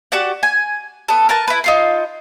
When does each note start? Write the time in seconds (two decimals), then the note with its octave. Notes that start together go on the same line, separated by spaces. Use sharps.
0.12 F#4 G4 D5 F#5
0.43 G#5
1.08 B3 A4
1.29 A#4 B4 A5
1.48 E4 B4
1.64 D#4 F4 C6